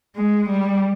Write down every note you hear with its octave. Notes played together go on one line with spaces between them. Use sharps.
G#3
G3